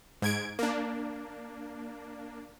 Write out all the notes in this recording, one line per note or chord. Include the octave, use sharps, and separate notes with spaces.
G#2 G#6 D7
A#3 D4